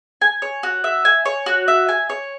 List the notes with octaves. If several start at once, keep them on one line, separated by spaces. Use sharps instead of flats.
G#5
C#5
F#4
E5
G#5
C#5
F#4
E5
G#5
C#5